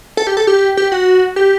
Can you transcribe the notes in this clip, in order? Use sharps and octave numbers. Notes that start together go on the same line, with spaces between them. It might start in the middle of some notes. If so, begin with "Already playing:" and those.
A4
G4
A4
G4
G4
F#4
G4